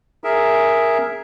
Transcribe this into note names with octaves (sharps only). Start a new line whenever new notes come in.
G#4 A#4 E5